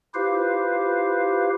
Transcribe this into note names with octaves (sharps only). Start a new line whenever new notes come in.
E4 F4 G4 B4 C5 F5